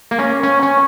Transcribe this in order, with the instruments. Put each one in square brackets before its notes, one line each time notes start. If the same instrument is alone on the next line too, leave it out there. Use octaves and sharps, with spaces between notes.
[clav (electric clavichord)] A#3
C#4
[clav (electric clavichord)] C#4 [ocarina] C#6
[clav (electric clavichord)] C#4